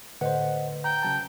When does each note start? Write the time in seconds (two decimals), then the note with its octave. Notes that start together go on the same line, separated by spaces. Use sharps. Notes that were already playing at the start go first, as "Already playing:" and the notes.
0.21 A2 D3 B4 C5 D#5 F#5
0.84 G5 A#5
1.03 C#3 F#3 A5